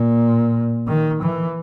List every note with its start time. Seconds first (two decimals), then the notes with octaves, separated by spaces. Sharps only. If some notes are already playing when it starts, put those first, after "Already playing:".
Already playing: A#2
0.88 D#3
1.22 E3